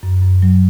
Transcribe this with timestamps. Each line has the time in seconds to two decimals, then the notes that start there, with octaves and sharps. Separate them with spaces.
0.03 F#2
0.23 F#2
0.43 F#3